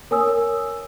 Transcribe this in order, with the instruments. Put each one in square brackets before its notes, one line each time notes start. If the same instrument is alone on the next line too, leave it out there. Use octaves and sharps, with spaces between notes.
[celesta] A#4 C#5 G#5 D#6 E6